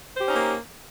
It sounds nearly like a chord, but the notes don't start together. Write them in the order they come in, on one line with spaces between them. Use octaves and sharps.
C5 G4 C#4 D#4 A#3